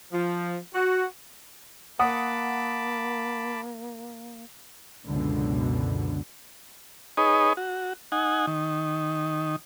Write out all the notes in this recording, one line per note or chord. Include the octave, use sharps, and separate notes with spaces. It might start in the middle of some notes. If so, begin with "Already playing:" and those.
F3
F#4
A#3 F#5 A5 B5 D6 D#6
C#2 F#2 B2 D3
D#4 G#4 B4 C#5 D#5
F#4
D#4 F#5 G#5
D#3